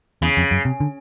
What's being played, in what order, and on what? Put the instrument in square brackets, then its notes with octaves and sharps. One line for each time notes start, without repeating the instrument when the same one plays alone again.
[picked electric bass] E2 [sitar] C#3
[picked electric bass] F2
F#2
C3
D3